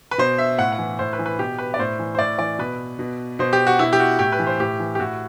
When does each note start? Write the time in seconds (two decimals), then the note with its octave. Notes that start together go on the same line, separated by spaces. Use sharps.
0.11 B4
0.18 B2 C5
0.38 E5
0.58 A2 F#5
0.73 F#5
0.79 E3
0.99 A2 C5
1.13 B4
1.19 E3
1.26 B4
1.39 B2 G4
1.58 B4
1.74 D5
1.79 A2 C5
1.99 E3
2.15 C5
2.19 A2 D5
2.39 E3 D5
2.59 B2 B4
2.99 B2
3.39 B2 C5
3.53 G4
3.67 F#4
3.79 B2 E4
3.93 G4
4.00 F#4
4.19 A2 G4
4.32 B4
4.39 E3
4.47 C5
4.60 A2 G4
4.80 E3
4.95 G4
4.99 A2 F#4